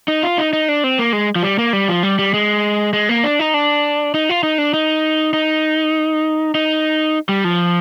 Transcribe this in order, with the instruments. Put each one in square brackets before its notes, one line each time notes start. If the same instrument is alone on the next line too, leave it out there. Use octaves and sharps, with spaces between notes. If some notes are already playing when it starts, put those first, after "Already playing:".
[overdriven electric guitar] D#4
F4
D#4
D#4
D4
C4
A#3
G#3
F3
G3
A#3
G3
F3
G3
G3
G#3
G#3
A#3
D4
D#4
D4
D#4
F4
D#4
D4
D#4
D#4
D#4
G3
F3